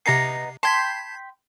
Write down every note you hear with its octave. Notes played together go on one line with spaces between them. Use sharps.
C3 B3 D#4 A#5 C7
G5 A5 B5 C6 G#6 B6